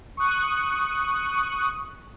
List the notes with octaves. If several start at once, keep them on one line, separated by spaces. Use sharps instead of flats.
C#6 D#6 F#6